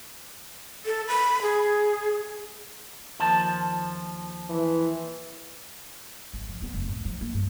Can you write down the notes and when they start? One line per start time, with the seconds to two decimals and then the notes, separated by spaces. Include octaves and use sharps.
0.86 A4
1.08 B5
1.42 G#4
3.20 D#2 F3 A5
4.50 E3
6.33 G#1
6.49 F3
6.62 B3
6.74 F1
6.89 A2
7.05 F3
7.21 A#3
7.34 G2